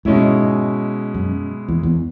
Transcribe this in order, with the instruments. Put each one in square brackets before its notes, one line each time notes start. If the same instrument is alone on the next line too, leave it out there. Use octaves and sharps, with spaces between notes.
[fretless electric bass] G#2 [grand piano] B2 G#3 C#4 E4
[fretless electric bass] F#2
E2
E2